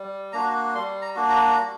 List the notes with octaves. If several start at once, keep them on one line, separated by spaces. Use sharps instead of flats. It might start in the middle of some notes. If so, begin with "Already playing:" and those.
Already playing: G3
A#3 D4 F#4 A#5
G3 C6
A#5
A#3 D4 F#4
A#5
G3